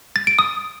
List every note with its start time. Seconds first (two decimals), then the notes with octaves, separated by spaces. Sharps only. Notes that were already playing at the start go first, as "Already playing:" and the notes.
0.16 A6
0.27 D7
0.39 D#6